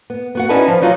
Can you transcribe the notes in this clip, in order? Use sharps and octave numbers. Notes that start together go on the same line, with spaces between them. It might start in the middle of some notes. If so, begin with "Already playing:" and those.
B3
B3 F#4 F#5
C#4 D#4 E4 B4 D5 A5
F3
F#3 D#4 F4 F#4